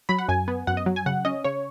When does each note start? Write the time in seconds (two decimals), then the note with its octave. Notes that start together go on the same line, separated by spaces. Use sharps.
0.09 F#3 B5
0.19 F#5
0.29 F#2 G#5
0.48 B3
0.67 F#2 F#5
0.77 D#5
0.86 F#3
0.96 G#5
1.06 C#3 F#5
1.25 C#4 D#5
1.44 C#3 C#5